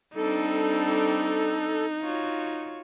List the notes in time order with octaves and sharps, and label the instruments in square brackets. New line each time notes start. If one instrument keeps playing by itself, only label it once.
[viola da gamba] G3 C4 D4 [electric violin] D#4 [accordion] A4
[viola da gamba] F4 F#4 C#5